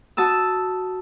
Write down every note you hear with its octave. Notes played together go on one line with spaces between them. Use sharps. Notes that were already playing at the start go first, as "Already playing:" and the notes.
F#4 A5 D#6 E6